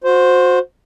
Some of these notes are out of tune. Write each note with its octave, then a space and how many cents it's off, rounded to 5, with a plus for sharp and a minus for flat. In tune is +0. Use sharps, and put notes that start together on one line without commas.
F#4 -30 C5 +0